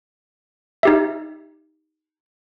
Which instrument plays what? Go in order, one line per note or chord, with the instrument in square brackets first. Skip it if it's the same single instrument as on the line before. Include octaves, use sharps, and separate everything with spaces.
[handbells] D#4 G4 E5